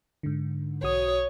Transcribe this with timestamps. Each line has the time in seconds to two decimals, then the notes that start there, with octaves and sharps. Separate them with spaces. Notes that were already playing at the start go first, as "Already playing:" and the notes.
0.23 G#2 D3
0.83 B1 F#4 C#5 D#6